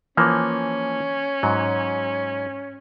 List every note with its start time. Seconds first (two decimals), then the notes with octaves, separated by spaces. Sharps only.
0.17 E3 F3 A#3 C#4
1.43 G#2 F#3